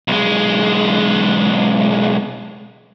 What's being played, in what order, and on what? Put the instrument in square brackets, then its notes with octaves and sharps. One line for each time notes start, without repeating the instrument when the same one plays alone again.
[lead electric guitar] B1 G#3